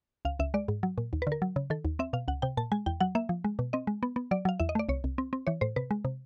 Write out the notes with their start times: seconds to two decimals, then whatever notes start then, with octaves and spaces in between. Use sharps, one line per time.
0.25 C#2 F5
0.39 C#2 E5
0.54 G#3 D5
0.68 G#2
0.83 F#3
0.98 A#2
1.13 D#2
1.22 B4
1.27 D3
1.32 A#4
1.42 F#3
1.56 C#3
1.70 D#3 A4
1.85 D#2
1.99 C4 E5
2.13 B2 F5
2.28 C#2 F#5
2.42 C3 G5
2.57 A#2 A5
2.72 G#3 G#5
2.86 E2 G5
3.00 F#3 F#5
3.15 A#3 E5
3.29 F3
3.44 G#3
3.59 B2
3.73 C4 D#5
3.87 G#3
4.03 B3
4.16 B3
4.31 F#3 D5
4.45 F#3 F5
4.60 E2 E5
4.69 D#5
4.75 A3 D5
4.89 C2 C#5
5.04 C2
5.18 C4
5.33 C4
5.47 E3 C#5
5.61 A2 C5
5.76 C3 B4
5.91 G#3
6.05 C3